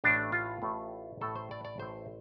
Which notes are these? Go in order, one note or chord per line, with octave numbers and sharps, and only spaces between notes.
A1 A2 A3 D4
F4
A1 A2 A3
A1 A2 A3 A4
C5
D5
D5
A1 A2 A3 C5